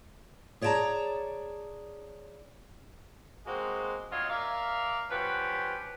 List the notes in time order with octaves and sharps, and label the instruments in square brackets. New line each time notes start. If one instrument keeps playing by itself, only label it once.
[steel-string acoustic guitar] G#4 C#5 D5 F#5 A5 A#5
[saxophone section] G#3 A#3 C4 F#4
F#3 C4 D4 F4 C#5 D#5
A#4 D5 E5 F5
F3 C#4 F#4 G4 B4